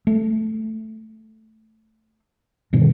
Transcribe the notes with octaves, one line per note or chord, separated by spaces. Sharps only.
A3
G2 B2 D3 D#3